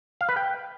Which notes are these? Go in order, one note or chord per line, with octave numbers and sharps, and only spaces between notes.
F5
B4
G5